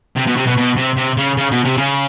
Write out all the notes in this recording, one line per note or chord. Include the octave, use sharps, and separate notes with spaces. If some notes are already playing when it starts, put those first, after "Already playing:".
C3
B2
C3
B2
B2
C3
C3
C#3
C#3
B2
C3
C#3